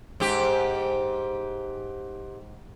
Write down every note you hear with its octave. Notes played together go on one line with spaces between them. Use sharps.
G#2 G4